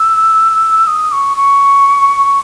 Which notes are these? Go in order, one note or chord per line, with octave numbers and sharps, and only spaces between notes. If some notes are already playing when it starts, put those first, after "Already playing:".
Already playing: E6
D#6
C#6
C#6